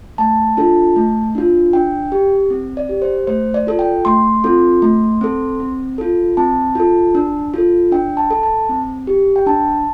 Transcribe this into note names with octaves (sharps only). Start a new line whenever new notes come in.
A3 A5
D4 F4 A4
A3
D4 F4
D4 G5
G4
C4
D5
G4
C5
A3 C5
D5
F4 A4
G5
A3 C6
C4 F4 A4
A3
C4 A4
C4
F4 A4
C4 A5
F4 A4
D4
F4 A4
D4 G5
A5
A4
A5
C4
G4
G5
D4 A5